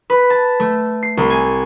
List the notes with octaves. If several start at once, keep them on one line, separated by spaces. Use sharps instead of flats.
B4
A5
A3
C7
C2
G#5